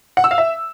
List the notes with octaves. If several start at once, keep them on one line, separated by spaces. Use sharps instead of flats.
F#5
E6
F5
E5